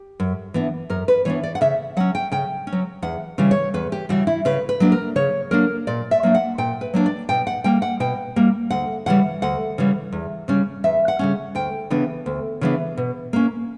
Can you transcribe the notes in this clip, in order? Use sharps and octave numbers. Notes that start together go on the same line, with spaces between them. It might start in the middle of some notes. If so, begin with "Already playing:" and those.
Already playing: G4
F#2
E3 B3 D4
F#2 A#4
B4
E3 B3 D4 C#5
D5
F#5
C#3 E5
F#3 C#4 F#5
G5
C#3 G5
C#4
F#3
E2 F#5
C#3 E3 G3
C#5
E2 B4
G4
C#3 E3 G3 F#4
E4
C#3 B4
B4
F#3 A#3 D4
A#4
C#3 C#5
F#3 A#3 D4 A#4
A#2 D5
E5
F#3 A#3 D4
F#5
A#2 G5
B4
F#3 A#3 D4
D5
B2 G5
F#5
G3 A#3 G5
F#5
B2 G5
G3 A#3
D2 F#5
C#3 E3 G3 F#5
D2 F#5
C#3 E3 G3
E2
C#3 G3 C#4
E2 E5
F#5
C#3 G3 C#4
D2 G5
C#3 E3 B3 D4
D2
C#3 E3 B3 D4
B2
A#3 C#4